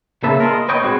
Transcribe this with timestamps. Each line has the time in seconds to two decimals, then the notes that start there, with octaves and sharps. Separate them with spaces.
0.23 C#3 A#3 B4 E5 A5
0.40 G#3 F4 A#4
0.53 D#5
0.68 B4 C#5 D#5 G5
0.82 G3 G#3 C4 F#4 B4 C#5